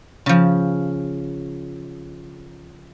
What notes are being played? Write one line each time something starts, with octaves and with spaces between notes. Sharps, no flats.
C#3 F3